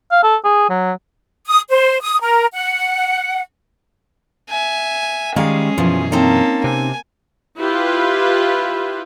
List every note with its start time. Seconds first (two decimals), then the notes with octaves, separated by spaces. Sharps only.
0.11 F5
0.23 A4
0.44 G#4
0.69 F#3
1.47 D#6
1.69 C5
2.01 D#6
2.20 A#4
2.54 F#5
4.50 E5 G#5
5.36 D#3 G3 G#3 C#4 G#4 F5
5.78 F#2 B2 E3 F3
6.12 A#3 C4 C#4 D#4 A5
6.64 C3 G#5
7.58 E4 F4 G4 B4